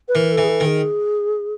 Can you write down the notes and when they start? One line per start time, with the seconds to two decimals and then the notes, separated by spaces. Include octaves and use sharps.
0.08 B4
0.15 E3 A#4
0.32 A4
0.38 E3
0.44 G#4
0.49 A4
0.60 D#3
0.66 G#4